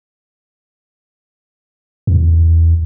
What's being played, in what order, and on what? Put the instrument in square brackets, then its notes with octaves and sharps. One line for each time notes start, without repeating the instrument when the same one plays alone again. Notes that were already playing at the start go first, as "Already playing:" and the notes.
[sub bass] E2